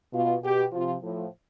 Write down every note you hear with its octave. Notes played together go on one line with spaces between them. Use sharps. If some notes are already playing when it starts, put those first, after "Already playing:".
B2 F4
B2 G4
C3 F3 F4
A2 F3